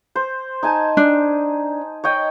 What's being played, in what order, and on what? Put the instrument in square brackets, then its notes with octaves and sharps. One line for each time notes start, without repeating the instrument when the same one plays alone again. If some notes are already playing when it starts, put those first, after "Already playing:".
[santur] C5
D#4 G#5 A5
[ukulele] D4
[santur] C#5 D#5 G5